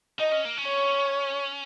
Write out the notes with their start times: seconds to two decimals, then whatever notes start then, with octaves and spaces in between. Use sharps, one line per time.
0.19 D#4 D#5
0.32 C#4
0.45 A#3
0.57 C#4
0.67 C#5